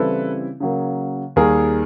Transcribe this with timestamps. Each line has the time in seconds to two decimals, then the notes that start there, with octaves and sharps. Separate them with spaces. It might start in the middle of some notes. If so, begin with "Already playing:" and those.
Already playing: C#3 E3 G3 C4 E4 A4 B4
0.60 C#3 F#3 A#3
1.36 D#2 D#3 G3 A#3 G#4 A#4